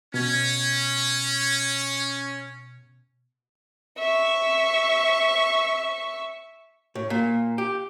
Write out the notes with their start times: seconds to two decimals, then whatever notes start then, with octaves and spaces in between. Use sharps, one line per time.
0.14 B2 C#4
3.98 E5 C#6
6.95 A2
7.10 A#2
7.58 G4